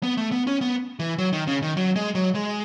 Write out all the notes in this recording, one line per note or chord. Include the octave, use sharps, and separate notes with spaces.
B3
A3
B3
C#4
B3
E3
F#3
D#3
C#3
D#3
F#3
G#3
F#3
G#3